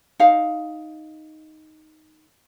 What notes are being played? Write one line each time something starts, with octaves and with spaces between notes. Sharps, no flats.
D#4 F5